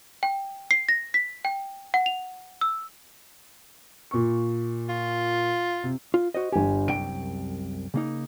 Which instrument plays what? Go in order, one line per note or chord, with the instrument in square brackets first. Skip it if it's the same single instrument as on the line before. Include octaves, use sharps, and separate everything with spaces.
[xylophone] G5
C7
A#6
B6
G5
F#5
F7
E6
[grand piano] A#2 C#6
[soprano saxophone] F4
[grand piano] C3
[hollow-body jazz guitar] F4
F#4 C5 D#5
[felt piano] G1 G#5 [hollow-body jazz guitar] G4
[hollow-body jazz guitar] C2 F#2 G5 [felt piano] D7
[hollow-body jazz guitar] C#3 A#3 D#4